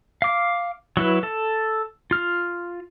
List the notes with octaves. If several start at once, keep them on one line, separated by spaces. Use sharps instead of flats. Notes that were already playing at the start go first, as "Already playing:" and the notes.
F5 D6
F#3 E4 B4
A4 A5
F4 F6